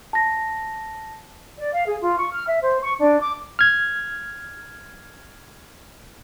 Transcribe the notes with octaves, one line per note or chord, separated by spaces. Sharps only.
A5 A#6
D5
F5
G#4
F4
C#6
F6
E5
C5
C#6
D4
D6
F6 G#6